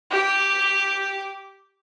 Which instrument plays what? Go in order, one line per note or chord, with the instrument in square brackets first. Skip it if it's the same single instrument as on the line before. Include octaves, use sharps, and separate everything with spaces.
[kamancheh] G4 D6